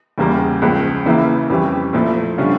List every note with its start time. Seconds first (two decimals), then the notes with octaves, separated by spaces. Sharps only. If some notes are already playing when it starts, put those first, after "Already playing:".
0.18 E2 C#3 G3 A#3
0.62 C#2 C#3 F3
1.06 C#3 E3 A#3 E4
1.50 F2 E3 G3 C#4 G4
1.93 A#2 F3 A3 E4
2.38 D3 G3 C#4 F4